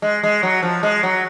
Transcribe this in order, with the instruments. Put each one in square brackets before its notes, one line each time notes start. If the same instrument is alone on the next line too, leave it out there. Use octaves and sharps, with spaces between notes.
[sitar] G#3
G#3
F#3
F3
G#3
F#3